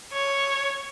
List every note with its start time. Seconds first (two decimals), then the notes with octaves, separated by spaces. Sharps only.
0.13 C#5